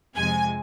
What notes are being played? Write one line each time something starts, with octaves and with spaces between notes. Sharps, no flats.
F2 C3 F3 G#3 G#5